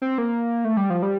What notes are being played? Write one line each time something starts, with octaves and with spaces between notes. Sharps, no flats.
C4
A#3
A3
G3
F3
G3